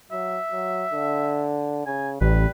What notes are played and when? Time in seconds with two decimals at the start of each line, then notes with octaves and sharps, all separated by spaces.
0.12 F#3 E5
0.52 F#3
0.93 D3
1.86 C#3 G#5
2.21 A1 G3 B4